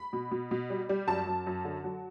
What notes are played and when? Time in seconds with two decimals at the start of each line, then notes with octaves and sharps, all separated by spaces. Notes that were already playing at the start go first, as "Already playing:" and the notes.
Already playing: B5
0.13 B2
0.31 B2
0.51 B2
0.70 G3
0.89 G3
1.08 F#2 A5
1.27 F#2
1.47 F#2
1.65 D3
1.84 F#3